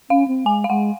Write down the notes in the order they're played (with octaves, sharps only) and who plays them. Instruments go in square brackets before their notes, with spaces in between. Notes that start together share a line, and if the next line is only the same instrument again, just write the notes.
[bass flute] C#4 [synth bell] F5
[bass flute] C4
[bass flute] G#3 [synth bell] G#5
[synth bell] F5
[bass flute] G#3 [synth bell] F#5